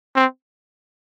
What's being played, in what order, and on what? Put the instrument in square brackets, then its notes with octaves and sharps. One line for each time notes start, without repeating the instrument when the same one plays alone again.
[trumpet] C4